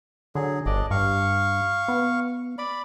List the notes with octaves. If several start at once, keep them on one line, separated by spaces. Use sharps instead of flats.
D3 F#3 G#4
G1 D4 D5 D#5
G2 F5 C#6
B3
D5 B5